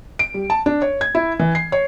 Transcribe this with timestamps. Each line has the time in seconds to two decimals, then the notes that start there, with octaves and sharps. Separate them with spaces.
0.19 D7
0.34 G3
0.50 A5
0.66 D4
0.82 C#5
1.01 G#6
1.15 E4
1.39 E3
1.55 C7
1.72 C#5